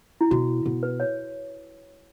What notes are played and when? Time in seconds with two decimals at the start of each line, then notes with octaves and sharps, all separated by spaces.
0.21 E4
0.31 B2 F#4
0.66 B2
0.83 B4
1.00 C#5